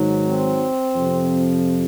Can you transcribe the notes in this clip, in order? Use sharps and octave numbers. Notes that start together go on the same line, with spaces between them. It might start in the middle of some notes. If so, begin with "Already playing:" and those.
Already playing: G#2 D#3 F#3
C4
F2 C3 F3